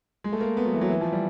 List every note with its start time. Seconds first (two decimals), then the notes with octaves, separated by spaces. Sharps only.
0.24 G#3
0.33 A3
0.41 A#3
0.57 B3
0.65 F#3
0.74 E3
0.81 F#3
0.90 E3
1.01 F3
1.12 G3